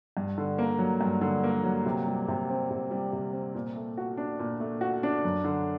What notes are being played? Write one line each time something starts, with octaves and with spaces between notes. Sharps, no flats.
G2
D3
A#3
F#3
G2
D3
A#3
F#3
C3
G3
C3
C4
C3
G3
C3
C4
A#2
A3
F#4
D4
A#2
A3
F#4
D4
F#2
D3